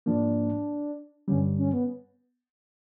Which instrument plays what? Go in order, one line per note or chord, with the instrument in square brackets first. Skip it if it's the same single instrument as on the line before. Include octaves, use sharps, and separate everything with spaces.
[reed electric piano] G#2 F3 A#3 [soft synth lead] D4
[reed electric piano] G2 D3 G3 [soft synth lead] C#4
[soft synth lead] C#4
B3